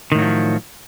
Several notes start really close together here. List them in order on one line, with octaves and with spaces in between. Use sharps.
D#3 A2 F#3 F3